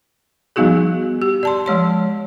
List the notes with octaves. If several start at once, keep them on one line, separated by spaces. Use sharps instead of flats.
F3 G3 B3 D#4 F#4 G#4
G4
D5 A5 C6
F3 G#3 C#5 C6